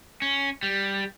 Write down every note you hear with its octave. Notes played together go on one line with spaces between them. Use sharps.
C#4
G3